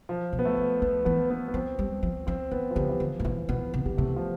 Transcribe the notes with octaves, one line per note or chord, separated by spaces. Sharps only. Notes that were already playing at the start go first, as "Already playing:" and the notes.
F3
B2
B3
A3
F3
F3 B3
E3 B3
B3
B3
F3 C4
G3
F3
F3 C4
E3 B3
F3
D3 G3
E3
D3 F3
A2 F3
B2 E3
B2 B3
C3 B3
D3 G3
C3 A3
F3